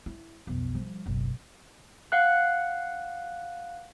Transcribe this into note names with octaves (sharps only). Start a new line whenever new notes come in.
E4
B1 F2
F3 G3
F#1 B1
F5 F#5 F#6